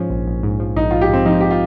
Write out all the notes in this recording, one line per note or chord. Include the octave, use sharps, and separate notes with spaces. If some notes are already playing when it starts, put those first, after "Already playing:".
Already playing: G#2 F3 C#4
A#1
A#1
G#2
F3
A#1 D#4
A#1 F4
G4
G#2 C4
F3 D#4
G4
F4